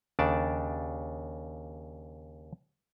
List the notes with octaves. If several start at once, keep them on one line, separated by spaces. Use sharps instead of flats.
D#2 C#3 D4 D5 A5